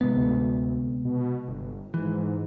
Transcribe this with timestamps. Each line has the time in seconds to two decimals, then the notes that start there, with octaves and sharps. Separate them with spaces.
0.01 G#1 C3 G#3 B3
0.16 D2
1.05 B2
1.47 G1
1.94 G#2 E3